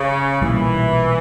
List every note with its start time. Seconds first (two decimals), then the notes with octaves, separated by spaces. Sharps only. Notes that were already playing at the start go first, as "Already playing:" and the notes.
Already playing: C#3
0.41 B1 A#2 E3 G3